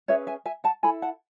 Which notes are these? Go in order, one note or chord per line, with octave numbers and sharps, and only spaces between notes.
C#4 G#4 B4 C#5 E5
E5 G#5
E5 G#5
F#5 A5
E4 A4 G#5 B5
F#5 A5